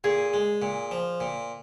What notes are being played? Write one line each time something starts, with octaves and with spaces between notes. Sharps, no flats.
A#2 G#4
G#3
A#2
F3
A#2